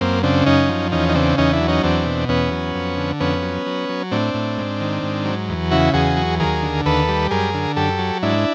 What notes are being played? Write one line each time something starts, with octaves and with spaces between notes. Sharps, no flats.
F#2 A#3 C4
C#3 C4 D4
F#2 C#4 D#4
F3
E2 C#4 D#4
D#4
C#3 C4 D4
E2 C#4 D#4
D4 E4
F#3
C#4 D#4
E2 C4 D4
B2
E2 B3 C#4
F#3
F2
D3
F2 B3 C#4
F#3
F#3
F#3
A2 C4 D4
A2
G#2
D#3
G#2
F#3
E2
C#3 E4 F#4
E2 F#4 G#4
F#3
D#2 G#4 A#4
D3
D#2 A4 B4
G3
F#2 G#4 A#4
D3
F#2 G4 A4
F#3
G#2 D4 E4